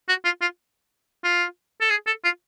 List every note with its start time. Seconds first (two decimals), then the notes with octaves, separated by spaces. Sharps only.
0.09 F#4
0.25 F4
0.41 F4
1.24 F4
1.81 A4
1.90 G#4
2.07 A4
2.24 F4